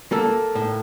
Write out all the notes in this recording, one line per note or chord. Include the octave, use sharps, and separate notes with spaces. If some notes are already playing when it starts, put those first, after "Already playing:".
A#3 A4
A2